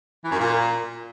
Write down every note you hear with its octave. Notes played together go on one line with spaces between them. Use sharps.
E3
F#2
A#2